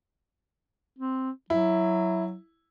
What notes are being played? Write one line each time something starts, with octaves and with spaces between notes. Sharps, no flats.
C4
F#3 E4